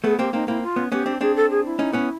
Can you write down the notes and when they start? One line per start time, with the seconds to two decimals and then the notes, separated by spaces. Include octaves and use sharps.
0.04 A3 B3 G#4
0.19 A#3 C4 G4
0.33 A#3 C4 D#4
0.48 A#3 C4 E4
0.62 F4
0.76 B3 C#4
0.92 B3 C#4 G4
1.06 C4 D4
1.21 C4 D4 G#4
1.36 A4
1.50 G#4
1.65 E4
1.79 C#4 D#4
1.93 B3 C#4